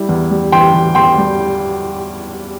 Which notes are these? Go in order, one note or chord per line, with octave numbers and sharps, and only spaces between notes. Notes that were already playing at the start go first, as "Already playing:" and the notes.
Already playing: G3 E4
E2
G3
E3 G5 C6
E3
E2 G5 C6
G3